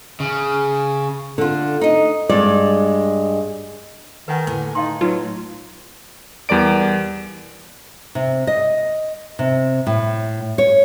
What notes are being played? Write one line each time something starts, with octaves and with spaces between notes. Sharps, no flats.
C#3
D3 F4
D#4 D#5
G2 G#3 D5
D#3 B4 F#5 G#5
A2 D3 A3 B4 G#5
D#4 D#5 F5 C6
F#3 D#4 F4 B4
E2 G3 A#4 D5 D7
C3
D#5
C3
A2
C#5